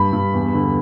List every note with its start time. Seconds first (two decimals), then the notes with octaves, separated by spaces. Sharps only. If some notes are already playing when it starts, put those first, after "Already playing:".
Already playing: G2 B5
0.13 G2
0.34 E2
0.54 D3